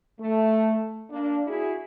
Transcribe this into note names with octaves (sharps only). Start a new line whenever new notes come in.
A3
A#3 D4
E4 F#4 G#4